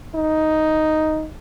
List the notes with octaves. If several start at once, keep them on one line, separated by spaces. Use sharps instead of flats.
D#4